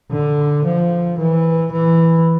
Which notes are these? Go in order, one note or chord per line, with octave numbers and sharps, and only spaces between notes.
D3
F3
E3
E3